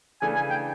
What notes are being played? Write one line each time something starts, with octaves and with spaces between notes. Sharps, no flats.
C#3 E3 A3 D4 G#5
G#5
G5